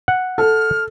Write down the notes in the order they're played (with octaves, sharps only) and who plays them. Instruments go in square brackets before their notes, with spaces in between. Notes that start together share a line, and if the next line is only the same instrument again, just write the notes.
[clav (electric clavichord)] F#5
[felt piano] A4 [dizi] F6